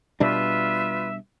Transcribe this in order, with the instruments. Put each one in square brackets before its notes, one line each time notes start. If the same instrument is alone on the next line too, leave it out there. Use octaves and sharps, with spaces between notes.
[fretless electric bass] B2 G3 D4 [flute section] F4 B4 [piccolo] E5